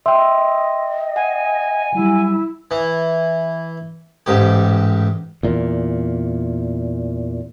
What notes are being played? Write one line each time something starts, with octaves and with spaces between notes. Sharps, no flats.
D#5 E5 G5 C6 E6
F#5 G#5
F#3 G3 E4
E3
A1 G#2 G4
E2 A#2